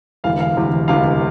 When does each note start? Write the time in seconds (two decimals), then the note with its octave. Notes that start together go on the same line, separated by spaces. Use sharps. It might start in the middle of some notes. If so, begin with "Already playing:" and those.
0.24 E1 D2 C3 E3 F5
0.40 F5
0.56 E1 D2 C3 E3
0.88 E1 D2 C3 E3 F5